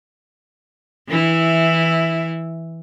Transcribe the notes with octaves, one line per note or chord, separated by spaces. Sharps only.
E3 E4